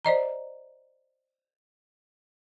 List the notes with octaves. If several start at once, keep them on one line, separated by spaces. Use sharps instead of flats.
C5 D5 D#5 A#5